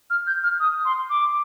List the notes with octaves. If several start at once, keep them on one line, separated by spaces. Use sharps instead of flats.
F6
G6
F6
D#6
C6
D6